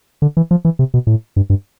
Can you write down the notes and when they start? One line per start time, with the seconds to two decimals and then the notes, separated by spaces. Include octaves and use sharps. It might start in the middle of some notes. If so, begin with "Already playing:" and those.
0.22 D3
0.37 E3
0.51 F3
0.65 E3
0.79 C3
0.94 B2
1.07 A2
1.36 G2
1.50 G2